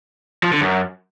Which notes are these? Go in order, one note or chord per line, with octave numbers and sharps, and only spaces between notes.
F3
D3
F#2